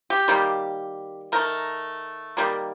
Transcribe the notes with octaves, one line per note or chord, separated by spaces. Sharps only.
G4
D#3 G3 A#3
D#3 A3 A#4
D#3 G3 A#3